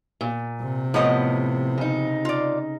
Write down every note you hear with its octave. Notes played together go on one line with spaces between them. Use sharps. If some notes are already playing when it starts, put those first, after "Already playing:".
A#2
C3
A2 F3 B3 D#5
C#3 D#4
F4 D5